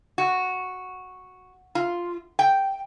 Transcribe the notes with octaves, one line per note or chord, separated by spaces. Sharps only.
F#4
F4
G5